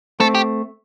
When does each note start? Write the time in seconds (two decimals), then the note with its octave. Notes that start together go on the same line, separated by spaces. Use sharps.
0.20 A3 C4 A4
0.35 G4